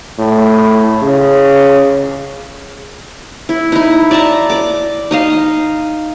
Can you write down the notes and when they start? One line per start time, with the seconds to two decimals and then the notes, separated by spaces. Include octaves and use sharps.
0.19 A2
1.02 C#3
3.49 E4
3.72 D#4 E4
4.11 D5 E5 A5 A#5
4.50 D5 D6
5.11 D#4 D#5 F5